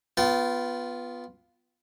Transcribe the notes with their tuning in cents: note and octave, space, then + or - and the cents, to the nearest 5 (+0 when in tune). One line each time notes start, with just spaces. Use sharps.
B3 +0 F4 +0 G5 -40